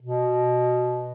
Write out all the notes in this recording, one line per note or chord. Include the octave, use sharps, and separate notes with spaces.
B2